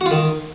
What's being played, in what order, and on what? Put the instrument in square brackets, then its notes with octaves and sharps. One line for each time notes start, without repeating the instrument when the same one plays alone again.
[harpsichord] F#4
F4
D#3